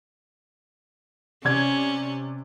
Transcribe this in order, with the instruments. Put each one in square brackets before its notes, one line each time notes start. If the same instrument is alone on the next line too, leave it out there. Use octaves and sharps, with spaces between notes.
[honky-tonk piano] C3 D5 G#6 [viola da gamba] C#4